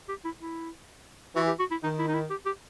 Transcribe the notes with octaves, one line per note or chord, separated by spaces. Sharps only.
G4
E4
E4
E3 F#4
G4
F#4
E4
D#3 D#4
E4
D#4
E4
G4
G4